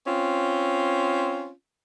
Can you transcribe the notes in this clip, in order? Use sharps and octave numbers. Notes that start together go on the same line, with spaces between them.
C4 C#4 F4